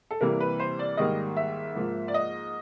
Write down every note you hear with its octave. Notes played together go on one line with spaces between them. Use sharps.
A4
C3 E3 G3 A#3 A#4
B4
C5
D5
G#2 D#3 G3 A#3 D#5
E5
G#2 F3 A#3
D5
D#5